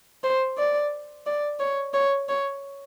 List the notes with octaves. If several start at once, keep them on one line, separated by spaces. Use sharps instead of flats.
C5
D5
D5
C#5
C#5
C#5